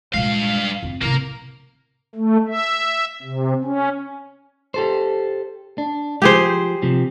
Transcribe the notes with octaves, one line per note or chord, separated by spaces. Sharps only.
G2 A#2 G#3 F5
F2
A2 C3 A#3 A#4
A3
E5
C3
C#4
G4 A4 C5
D4
F3 G4 G#4 C5
C3 F3